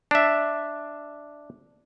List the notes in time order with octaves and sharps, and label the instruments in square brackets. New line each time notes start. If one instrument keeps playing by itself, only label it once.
[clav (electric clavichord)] D4 E5